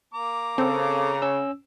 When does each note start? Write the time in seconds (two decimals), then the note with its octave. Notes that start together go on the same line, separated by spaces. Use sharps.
0.14 A#3 A#5 D6
0.58 C#3 C4 A4
1.22 C#4 E6